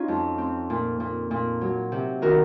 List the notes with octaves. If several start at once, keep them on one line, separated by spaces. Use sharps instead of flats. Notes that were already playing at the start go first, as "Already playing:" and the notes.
Already playing: C#4 D#4 F4
F2
C4
A#2
A#2
A#2
F#3
C3
D#3 F#4 A#4